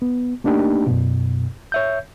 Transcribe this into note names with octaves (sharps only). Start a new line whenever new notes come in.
B3
A3 A#3 D4 D#4 G4
F#2 B2
C#5 E5 G6